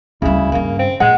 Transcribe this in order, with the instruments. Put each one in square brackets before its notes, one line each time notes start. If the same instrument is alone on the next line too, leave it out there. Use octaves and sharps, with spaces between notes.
[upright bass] D2 G3 [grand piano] C#3 [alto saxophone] E4
[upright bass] G2 D#3 [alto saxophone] A#3
[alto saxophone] C4
[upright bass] A#1 [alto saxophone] G#3 [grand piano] F#5